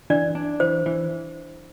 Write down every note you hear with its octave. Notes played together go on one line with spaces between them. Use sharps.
E3 D4 D5
D4
E3 C5
E3